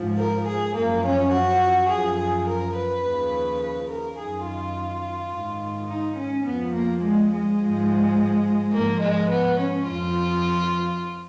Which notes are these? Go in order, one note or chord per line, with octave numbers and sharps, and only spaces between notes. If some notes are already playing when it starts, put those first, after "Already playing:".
Already playing: G#2 F3
A#4
G#4
F#2 F3 A#3
C#4
F#4
F#2 F3 G#4
G#4
A#4
B4
D#2 C#3 F3
B4
A#4
F#2 D#3 G#4
F4
G#2 D#3
D#4
C#4
F2 F3 B3
A#3
G#3
G#3
G#2 F3
G#2 F3 A#3
G#3
B3
C#4
F2 F3 F4